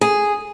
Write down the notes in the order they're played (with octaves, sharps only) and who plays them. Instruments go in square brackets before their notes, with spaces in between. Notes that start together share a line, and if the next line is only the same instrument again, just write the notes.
[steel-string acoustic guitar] G#4